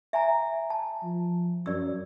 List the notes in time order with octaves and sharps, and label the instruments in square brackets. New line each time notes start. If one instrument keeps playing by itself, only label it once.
[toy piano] E5 G#5 A#5
A5
[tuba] F3
[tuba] F#2 [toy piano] D5 E6